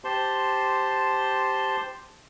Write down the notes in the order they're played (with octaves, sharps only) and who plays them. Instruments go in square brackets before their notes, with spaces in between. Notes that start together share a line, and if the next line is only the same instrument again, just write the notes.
[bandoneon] G4 C5 A5 C6